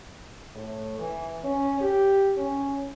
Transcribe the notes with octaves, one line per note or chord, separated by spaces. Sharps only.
A2
E3
C#4
G4
C#4